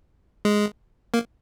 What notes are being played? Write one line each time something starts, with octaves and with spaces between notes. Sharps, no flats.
G#3
A#3